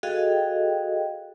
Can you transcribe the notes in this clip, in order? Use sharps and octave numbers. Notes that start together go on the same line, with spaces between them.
F#4 G#4 A4 D#5 F5 G5